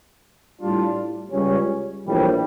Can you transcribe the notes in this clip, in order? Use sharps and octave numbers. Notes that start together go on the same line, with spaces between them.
A2 G3 D4 F4
C#2 C#3 G3 C#4
A#1 A2 E3 G3 D4